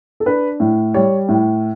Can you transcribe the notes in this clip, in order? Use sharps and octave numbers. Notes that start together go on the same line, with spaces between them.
A4
D4 B4
A2
G3 C#5
A2